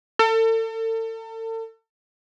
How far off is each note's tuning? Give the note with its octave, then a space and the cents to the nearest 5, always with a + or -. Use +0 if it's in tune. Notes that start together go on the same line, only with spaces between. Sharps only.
A4 +35